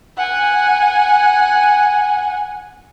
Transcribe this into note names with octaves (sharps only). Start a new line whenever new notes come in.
F#5 G#5